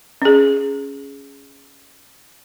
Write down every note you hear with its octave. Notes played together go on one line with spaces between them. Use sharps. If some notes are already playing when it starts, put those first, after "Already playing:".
C#4 G#4